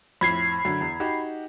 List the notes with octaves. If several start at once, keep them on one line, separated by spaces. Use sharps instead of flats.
F2 A2 B5 G#6 C7
F#2 D3
E2
D#4 F#4 G4